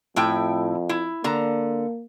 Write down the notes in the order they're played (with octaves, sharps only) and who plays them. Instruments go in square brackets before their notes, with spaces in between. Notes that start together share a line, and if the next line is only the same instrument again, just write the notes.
[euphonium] F2 [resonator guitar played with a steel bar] A2 E4 G5
[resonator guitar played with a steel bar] E4
[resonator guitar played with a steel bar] D3 A#5 [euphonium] A#3